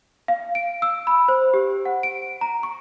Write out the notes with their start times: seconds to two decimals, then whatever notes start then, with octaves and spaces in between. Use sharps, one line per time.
0.28 F5
0.55 D7
0.82 E6
1.07 B5
1.28 C5
1.54 G4
1.85 F#5
2.03 D7
2.41 A#5
2.63 C#6